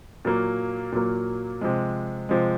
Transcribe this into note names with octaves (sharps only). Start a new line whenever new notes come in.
A#2 F#3 A#3
A#2 F#3 A#3
C3 F3 G#3
C3 F3 G#3